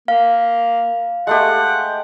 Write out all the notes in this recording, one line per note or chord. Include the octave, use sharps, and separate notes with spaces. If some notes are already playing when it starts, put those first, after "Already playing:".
A#3 F5
G#3 A3 G4 F#5